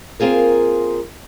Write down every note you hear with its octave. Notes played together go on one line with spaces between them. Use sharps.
A#3 C4 F4 G#4 A#4